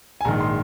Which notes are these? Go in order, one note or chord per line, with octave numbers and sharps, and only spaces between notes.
G#5
A#1 G#2 D#3 A#5
C6